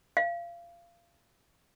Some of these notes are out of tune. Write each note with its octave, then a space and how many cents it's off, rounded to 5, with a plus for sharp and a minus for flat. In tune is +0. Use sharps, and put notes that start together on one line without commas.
F5 -25